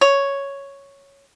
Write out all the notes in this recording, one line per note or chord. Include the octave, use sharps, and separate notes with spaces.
C#5